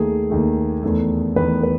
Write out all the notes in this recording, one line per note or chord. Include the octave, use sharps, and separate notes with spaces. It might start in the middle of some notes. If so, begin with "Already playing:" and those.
Already playing: D#2 D#3 A3 G#4
D#2 D#3 A3
E2 D#3 A3
E2 D#3 A3 B4
B4